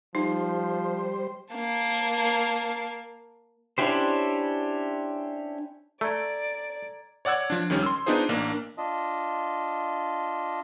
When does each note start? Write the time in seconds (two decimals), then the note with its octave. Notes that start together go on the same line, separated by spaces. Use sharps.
0.15 F3 G3 D#4 C5
1.54 A#3 A5
3.78 C#4 D4 E4 G4 C5
6.01 A3 A4 D5 A#5 G#6
7.25 C#5 D5 F#5 E6 G#6
7.50 F3 D4
7.70 C#2 D#3 G3 C#4
7.83 C6 E6
8.06 B3 D4 D#4 F4 G#4 C5
8.29 A1 A#3 D4
8.77 D4 F4 D#5